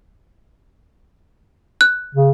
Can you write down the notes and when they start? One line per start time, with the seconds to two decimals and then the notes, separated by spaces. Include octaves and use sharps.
1.81 F#6
2.15 C#3